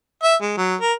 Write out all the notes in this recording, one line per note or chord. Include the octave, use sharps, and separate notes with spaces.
E5
G#3
F#3
A#4